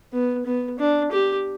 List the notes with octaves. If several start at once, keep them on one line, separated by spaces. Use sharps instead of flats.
B3
B3
D4
G4